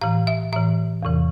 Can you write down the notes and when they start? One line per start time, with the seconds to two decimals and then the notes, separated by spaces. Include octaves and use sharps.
0.01 A2 E3 F5
0.27 E5
0.52 A2 E3 E5
1.03 E2 C3 E3